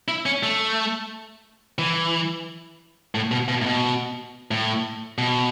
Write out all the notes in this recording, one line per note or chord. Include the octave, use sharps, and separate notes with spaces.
E4
C#4
A3
E3
A2
B2
B2
A2
B2
A2
B2